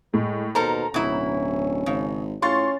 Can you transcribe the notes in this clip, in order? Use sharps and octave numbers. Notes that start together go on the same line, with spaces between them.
A2 G#3
D#2 B2 A4 A#4 C5 A#5
D1 B2 C#4 E4
G#1 C#3
A2 C#4 F4 C6 C#6 A6